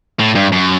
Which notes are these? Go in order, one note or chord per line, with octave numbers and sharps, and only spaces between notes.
A2
G2
F#2